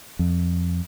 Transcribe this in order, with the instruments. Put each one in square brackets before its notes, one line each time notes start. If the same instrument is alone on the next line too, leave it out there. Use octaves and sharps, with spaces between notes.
[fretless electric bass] F2